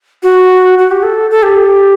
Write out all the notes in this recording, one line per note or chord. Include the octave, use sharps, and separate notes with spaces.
F#4
F#4
G4
A4
A4
G4